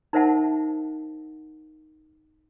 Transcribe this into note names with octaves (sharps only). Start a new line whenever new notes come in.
D#4 A#4 C5 E5 F#5 A5